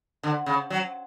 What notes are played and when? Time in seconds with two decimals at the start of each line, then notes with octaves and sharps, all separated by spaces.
0.23 D3
0.46 C#3
0.70 F#3